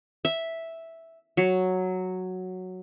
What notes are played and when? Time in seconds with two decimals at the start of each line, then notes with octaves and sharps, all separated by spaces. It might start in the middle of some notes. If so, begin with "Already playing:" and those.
0.25 E5
1.37 F#3